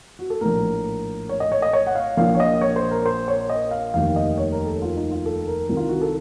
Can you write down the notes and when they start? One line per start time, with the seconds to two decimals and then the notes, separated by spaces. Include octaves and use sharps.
0.19 F#4
0.30 A4
0.41 A#1 A2 A#4
1.29 C#5
1.40 D#5
1.52 C#5
1.62 D#5
1.73 C#5
1.87 F#5
1.95 F5
2.17 A#1 A#2 F5
2.35 C#5
2.40 D#5
2.61 C#5
2.76 C5
2.91 A#4
3.06 C5
3.28 C#5
3.50 D#5
3.71 F5
3.94 F1 D#2 D#3 F5
4.16 D#5
4.38 C#5
4.52 A#4
4.67 A4
4.82 F4
4.97 D#4
5.11 F4
5.26 A4
5.47 A#4
5.69 C2 C3 D#3
5.77 F4
5.89 F#4
6.01 A4